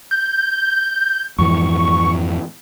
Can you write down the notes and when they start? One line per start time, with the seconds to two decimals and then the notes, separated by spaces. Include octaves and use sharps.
0.11 G6
1.38 F2 G#2 E3 C#6